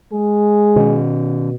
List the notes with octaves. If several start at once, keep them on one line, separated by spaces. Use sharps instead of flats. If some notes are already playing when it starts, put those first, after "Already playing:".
G#3 G#4
B2 D#3 C#4